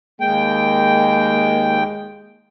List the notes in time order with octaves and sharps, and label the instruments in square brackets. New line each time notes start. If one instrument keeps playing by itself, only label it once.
[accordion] D#2 G5 [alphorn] G#3 [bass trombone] A#3